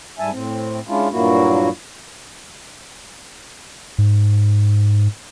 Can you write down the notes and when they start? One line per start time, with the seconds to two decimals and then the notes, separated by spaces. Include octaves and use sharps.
0.19 G#2 G3 E5 G#5 A5
0.31 A2 C4
0.87 G#3 C#4 D4 E4 F4
1.11 G2 A#2 F#3 A#3 E4 F#4
3.98 G#2